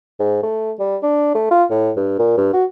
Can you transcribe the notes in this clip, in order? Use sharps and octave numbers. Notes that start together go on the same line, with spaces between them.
G#2
A3
G3
D4
A3
F4
A2
G2
A#2
G2
F#4